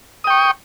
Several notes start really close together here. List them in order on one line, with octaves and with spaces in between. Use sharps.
D#6 G5 C#6